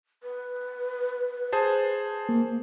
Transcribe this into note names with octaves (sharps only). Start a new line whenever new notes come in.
B4
G#4 C5 A5
A#3